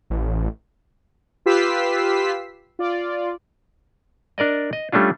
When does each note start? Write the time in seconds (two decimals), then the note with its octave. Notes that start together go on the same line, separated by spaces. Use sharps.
0.10 A1
1.46 F4 G4 B4 E6 B6 C7
2.79 F4 D5
4.38 D4 A#4 D5 D#5
4.73 D#5
4.92 G3 A3 C#4 D4 F4